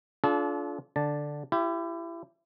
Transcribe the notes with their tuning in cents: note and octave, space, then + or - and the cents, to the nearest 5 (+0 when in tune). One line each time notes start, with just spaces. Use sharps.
D4 -25 F4 +0 A4 -40
D3 +0 D5 +0 A5 +0
E4 +30 G4 +0